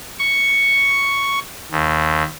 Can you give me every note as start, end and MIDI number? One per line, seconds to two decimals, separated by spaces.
0.19 1.39 85
1.71 2.23 39